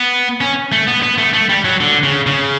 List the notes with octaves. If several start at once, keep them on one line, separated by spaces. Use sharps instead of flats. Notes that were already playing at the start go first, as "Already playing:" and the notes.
Already playing: B3
C#4
A3
B3
B3
A3
A3
G3
F#3
D3
C#3
C#3